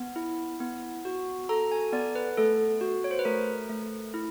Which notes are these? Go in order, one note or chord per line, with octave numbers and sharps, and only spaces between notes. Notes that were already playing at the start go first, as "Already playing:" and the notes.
Already playing: B3
E4
B3
F#4
A4 A#5
G#5
B3 D5
B4
A3 A4
F#4
C#5
C5
B4
A3 A#4
A3
E4